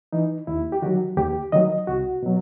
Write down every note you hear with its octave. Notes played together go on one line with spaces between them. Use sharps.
E3 D#4
D#2 E4
G4
D#3 F#3 F#4
D#2 G4
D#3 F#3 D#5
C2 F#4
B2 F#3